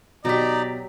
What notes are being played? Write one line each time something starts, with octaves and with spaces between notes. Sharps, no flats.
B2 F#3 D#4 G4 D5 A#5 B6